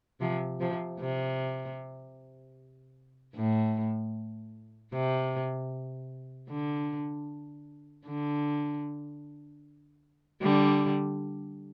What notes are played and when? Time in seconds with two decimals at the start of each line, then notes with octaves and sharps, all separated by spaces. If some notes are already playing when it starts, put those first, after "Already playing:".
0.21 C3 F3
0.60 C3 F3
1.00 C3
3.35 A2
4.92 C3
6.49 D3
8.06 D3
10.42 D3 G3